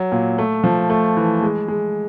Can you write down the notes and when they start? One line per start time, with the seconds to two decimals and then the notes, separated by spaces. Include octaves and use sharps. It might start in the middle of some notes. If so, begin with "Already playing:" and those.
Already playing: F#3
0.12 A#2
0.38 A3
0.64 F3
0.90 A3
1.17 E3
1.42 G#3
1.68 G#3